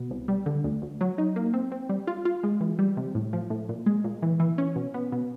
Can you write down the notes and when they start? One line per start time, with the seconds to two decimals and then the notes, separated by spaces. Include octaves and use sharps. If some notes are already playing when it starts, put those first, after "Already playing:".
Already playing: B2 B3
0.11 C2
0.28 G3
0.46 D3
0.64 D2
0.82 D2
1.01 F#3
1.18 D#4
1.36 A#3
1.54 C4
1.72 C4
1.89 G3
2.07 F4
2.25 F4
2.43 G#3
2.61 E3
2.79 G3
2.97 C3
3.15 A2
3.33 F3
3.50 A2
3.69 A#2
3.86 G#3
4.04 A#2
4.22 E3
4.40 E3
4.58 C#4
4.76 B2
4.94 B3
5.12 B2